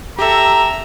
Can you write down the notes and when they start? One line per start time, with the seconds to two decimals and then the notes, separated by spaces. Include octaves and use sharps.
0.19 G4 A4 E5 A#5